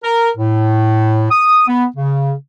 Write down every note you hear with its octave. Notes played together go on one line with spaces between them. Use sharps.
A#4
A2
D#6
B3
C#3